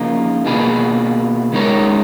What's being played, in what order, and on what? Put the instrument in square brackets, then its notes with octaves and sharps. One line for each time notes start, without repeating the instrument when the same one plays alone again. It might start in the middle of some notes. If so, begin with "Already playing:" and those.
Already playing: [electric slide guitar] C#3 F3 A#3 D#4
B2 A#3 F4 G#4 B4
C#3 G#3 D#4 A#4 C#5